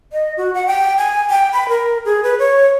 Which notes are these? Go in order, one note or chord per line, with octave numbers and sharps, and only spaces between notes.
D#5
F#4
F#5
G5
G#5
G5
B5
A#4
G#4
B4
C#5